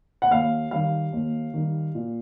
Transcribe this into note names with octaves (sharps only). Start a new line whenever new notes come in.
F#5
D#2 F5
D#3 G3 F5
D#2
D#3 G3
A#2